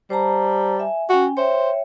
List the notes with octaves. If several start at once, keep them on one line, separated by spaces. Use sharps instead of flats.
G3 C5 A5 A#5
E5 G#5
C#4 F#4 G5 G#5
C5 C#5 E5 G5